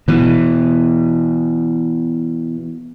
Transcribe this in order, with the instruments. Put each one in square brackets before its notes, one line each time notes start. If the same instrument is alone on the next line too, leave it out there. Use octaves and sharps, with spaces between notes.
[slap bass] B2 E3